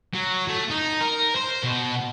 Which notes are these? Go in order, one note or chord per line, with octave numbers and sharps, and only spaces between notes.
F#3
A3
D#4
A#4
C5
B2